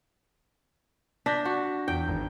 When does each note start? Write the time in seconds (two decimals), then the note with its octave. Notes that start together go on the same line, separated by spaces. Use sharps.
1.26 D4 G6 A#6 B6
1.45 F#4
1.88 E2 G5
2.08 G#1